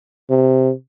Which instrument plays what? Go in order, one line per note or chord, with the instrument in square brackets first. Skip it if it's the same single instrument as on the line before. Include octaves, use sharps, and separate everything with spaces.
[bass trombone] C3